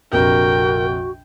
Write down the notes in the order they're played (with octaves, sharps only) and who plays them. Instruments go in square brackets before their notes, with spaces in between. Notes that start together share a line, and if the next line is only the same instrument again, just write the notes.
[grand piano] A#1 F2 C3 [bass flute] F#4 [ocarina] A#4 [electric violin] G5